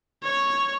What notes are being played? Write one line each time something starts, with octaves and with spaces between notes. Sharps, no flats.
C#5